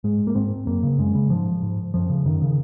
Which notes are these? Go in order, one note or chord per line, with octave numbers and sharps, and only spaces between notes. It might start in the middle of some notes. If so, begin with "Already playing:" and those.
G#2 G#3
A#3
G#2 C4
F#2 A#3
C#3
F#2 G#3
C#3
G#2 F3
G#2
F#2 F3
C#3
F#2 D#3
C#3